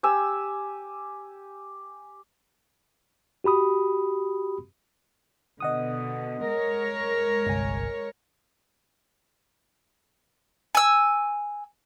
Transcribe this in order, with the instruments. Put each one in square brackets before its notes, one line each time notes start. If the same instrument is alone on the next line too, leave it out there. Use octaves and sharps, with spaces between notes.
[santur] G4 G#5 E6
[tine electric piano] F#4 G4 B5 D#6
[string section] B2 D3 [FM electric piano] D#5 F#5 D#6
[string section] G#3 A#4 C#5
[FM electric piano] G1 C2 G#5
[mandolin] G#5 E6